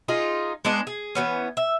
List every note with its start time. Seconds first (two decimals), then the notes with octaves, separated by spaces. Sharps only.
0.08 D#4 F4 G#4
0.65 G#3 B3 D4 D#5
0.87 G#4
1.15 E3 G#3 B3 C#4
1.57 E5